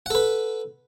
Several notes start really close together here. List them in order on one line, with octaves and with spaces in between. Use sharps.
F#5 A4 B4